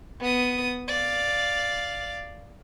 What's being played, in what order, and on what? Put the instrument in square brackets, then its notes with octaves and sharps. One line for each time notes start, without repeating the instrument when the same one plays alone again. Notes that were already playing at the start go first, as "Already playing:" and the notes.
[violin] B3 D#6
D5 F5